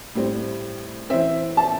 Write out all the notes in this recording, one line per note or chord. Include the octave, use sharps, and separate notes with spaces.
A2 G3 C4
E3 C4 E5
A5